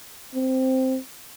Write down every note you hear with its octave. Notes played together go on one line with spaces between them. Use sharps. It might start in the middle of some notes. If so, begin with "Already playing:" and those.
C4